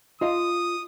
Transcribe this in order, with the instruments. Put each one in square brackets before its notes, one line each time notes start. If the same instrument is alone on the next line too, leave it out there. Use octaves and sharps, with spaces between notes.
[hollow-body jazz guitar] F4 D#5 [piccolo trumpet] D#6